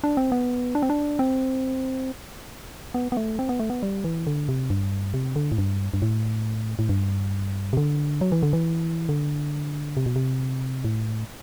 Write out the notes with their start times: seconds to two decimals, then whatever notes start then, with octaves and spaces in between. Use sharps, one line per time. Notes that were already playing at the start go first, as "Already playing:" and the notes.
0.04 D4
0.17 C4
0.32 B3
0.75 D4
0.82 C4
0.90 D4
1.19 C4
2.94 B3
3.12 B3
3.17 A3
3.39 C4
3.49 B3
3.60 A3
3.70 B3
3.83 G3
4.04 E3
4.27 D3
4.49 C3
4.70 G2
5.14 C3
5.36 D3
5.52 A2
5.58 G2
5.94 G2
6.02 A2
6.79 A2
6.89 G2
7.73 C3
7.77 D3
8.21 F#3
8.32 E3
8.43 D3
8.53 E3
9.09 D3
9.97 C3
10.06 B2
10.16 C3
10.85 A2